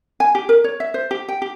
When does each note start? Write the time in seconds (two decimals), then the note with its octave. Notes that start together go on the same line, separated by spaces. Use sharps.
0.20 G#5
0.35 G4
0.49 A#4
0.64 C#5
0.80 E5
0.94 C5
1.11 G4
1.29 G5
1.42 G4